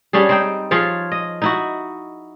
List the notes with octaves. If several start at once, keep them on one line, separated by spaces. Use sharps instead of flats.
G3 C#4 D4 G#4
C4 D#4 G5
F3 F4 G#4 C#5
D#5
D#4 E4 F#4